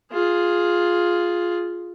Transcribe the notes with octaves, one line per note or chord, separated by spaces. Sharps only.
F4 G#4